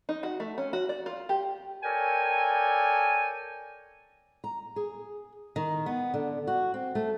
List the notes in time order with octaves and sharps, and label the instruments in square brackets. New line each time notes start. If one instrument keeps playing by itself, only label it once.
[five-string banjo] D#4
F#4
A3
C#4
F#4
D5
F4
G4
[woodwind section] A4 A#4 C#5 D5 G5 G#5
[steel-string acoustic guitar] A#5
G#4
D#3
B3
D3
F#4
C4
A3